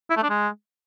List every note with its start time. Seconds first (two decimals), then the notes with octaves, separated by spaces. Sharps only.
0.10 E4
0.17 A3
0.23 D4
0.30 G#3